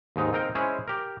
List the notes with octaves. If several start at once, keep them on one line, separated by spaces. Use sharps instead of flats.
D#2 G#2 D#4
C4 D#4 A#4 F5 G5
G#3 C#4 E4 G#4 C5 C#5
G4 A#4